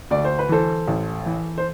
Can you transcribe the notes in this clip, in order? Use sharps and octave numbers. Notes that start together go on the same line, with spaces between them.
D2 D5
C5
B4
E3 A4 C5
A1
E3
C5